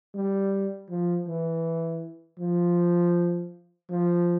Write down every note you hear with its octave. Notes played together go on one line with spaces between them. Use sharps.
G3
F3
E3
F3
F3